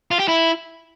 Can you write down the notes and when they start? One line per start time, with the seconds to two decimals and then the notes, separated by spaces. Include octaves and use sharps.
0.11 F4
0.19 G4
0.28 E4